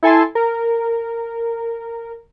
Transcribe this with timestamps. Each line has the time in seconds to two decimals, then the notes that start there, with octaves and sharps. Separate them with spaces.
0.03 E4 A4 G#5 A5 C6
0.35 A#4